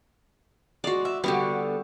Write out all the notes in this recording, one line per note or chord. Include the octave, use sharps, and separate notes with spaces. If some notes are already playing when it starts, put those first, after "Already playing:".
G#3 F#4 D5
E5
D3 G3 B3 F#4 G4